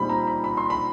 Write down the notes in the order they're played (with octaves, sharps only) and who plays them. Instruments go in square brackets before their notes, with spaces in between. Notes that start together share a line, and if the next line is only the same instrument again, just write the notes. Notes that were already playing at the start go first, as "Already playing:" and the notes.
Already playing: [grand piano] A#2 G3 C4 D#4 B5
A#5
B5
B5
C6
B5